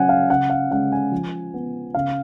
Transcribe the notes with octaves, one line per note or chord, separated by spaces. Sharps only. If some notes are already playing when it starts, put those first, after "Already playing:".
Already playing: C#3 F#3 C#4 F#5 G#5
F5
C#3 F#5
F5
G#3 C#4 F#5
G#5
F3
B3
C#3 F5